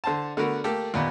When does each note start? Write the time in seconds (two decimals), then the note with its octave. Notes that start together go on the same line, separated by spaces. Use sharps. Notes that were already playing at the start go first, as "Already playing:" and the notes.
0.04 D3 C5 A5
0.37 D3 A3 B3 F#4 A#4
0.64 A3 A#3 G4 A4
0.94 D#2 A#2 B3